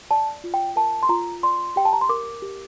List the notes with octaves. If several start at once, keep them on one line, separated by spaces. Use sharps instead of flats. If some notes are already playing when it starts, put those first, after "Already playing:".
D5 A5
F4
G5
A#4 A5
C6
F4 A#5
D5 C6
G4 G5
A5
A#5
C6
A#4 D6
G4